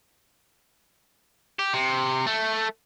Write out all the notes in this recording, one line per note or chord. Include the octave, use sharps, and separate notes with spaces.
G4
C3
A3